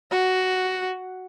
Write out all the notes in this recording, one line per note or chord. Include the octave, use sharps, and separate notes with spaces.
F#4